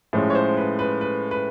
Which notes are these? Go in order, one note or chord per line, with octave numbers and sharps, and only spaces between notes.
A2 F3 G#3 C#4
C#5
C5
B4
B4
B4
B4